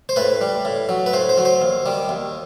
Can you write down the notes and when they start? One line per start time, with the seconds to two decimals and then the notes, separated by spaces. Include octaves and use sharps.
0.09 C5
0.16 A2 B4
0.41 G3
0.65 A2
0.89 F#3
1.06 B4
1.13 A2 C5
1.29 C5
1.38 F#3
1.45 C5
1.62 D#2
1.86 D#3 G3
2.09 D#2